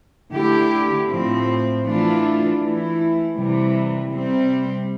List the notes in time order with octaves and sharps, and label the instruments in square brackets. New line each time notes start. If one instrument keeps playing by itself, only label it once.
[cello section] D3 A3 E4 G4
A2 F3 C4
E3 A3 D4 F4
E3 A3 E4
C3 E3 G3
C3 G3 C4